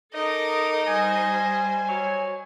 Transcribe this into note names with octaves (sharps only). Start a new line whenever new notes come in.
D#4 A4 A#4 D#5 D6
G3 C5 G#5
F#3